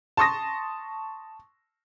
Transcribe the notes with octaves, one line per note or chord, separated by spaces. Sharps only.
A5 C6 C#6 D#6 A#6